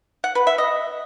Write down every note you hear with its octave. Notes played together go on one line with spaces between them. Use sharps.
F#5
B4
E5
D#5